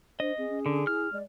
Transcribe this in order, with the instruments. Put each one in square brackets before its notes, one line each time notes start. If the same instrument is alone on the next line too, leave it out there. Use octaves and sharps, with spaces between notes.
[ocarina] D4 [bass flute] C5 [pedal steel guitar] D#5
[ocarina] C4 [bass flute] G#4
[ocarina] C#4
[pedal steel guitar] D3
[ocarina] E4 [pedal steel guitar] F6
[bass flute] G#3 [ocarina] D5